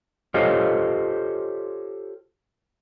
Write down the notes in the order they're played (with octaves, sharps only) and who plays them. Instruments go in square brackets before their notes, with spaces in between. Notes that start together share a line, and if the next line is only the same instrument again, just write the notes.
[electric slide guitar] F4 G4 A4 C5 C#5 D#5